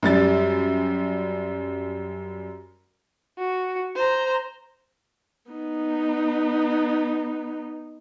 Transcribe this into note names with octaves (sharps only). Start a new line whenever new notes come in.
F#2 G3 A6
F#4
C5 A#5
B3 D#4